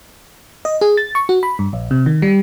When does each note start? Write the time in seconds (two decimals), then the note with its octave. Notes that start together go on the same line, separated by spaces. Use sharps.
0.65 D#5
0.81 G#4
0.97 A6
1.15 C#6
1.29 F#4
1.43 B5
1.59 G2
1.73 A#1
1.91 C3
2.06 D#3
2.22 G3